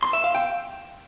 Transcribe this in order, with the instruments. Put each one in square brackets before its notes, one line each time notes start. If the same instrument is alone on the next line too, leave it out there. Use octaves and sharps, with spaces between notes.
[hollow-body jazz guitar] C6
E5
F5
G5